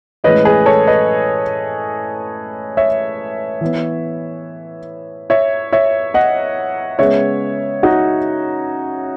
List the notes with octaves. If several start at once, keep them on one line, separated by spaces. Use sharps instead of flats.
A2 E3 G#3 C#4 B4 D#5
G#4 B4
A4 C#5
B4 D#5
C#5 E5
E3 B3
C#5 E5
C#5 E5
D#5 F#5
C#3 G#3 B3 C#5 E5
D#4 F#4